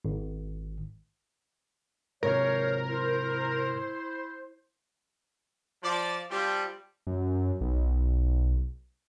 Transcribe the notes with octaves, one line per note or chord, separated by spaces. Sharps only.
G#1
G#2 C3 A#4 C5 C#5
E4 C5
F3 D5
F3 G3 C4
F#2
B1